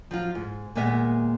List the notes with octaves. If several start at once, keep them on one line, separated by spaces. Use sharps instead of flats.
F3 F#3 F4
G#2
D#2 A#2 G#3 A#3 B3 E5